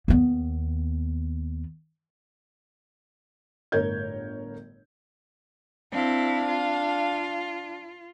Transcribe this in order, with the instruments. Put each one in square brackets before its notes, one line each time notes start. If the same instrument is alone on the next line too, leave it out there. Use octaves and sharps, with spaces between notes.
[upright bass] D#2 B3
[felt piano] G1 A2 A#4 C#5 G6 G#6
[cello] C4 E4 [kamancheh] D4 F5
[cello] F4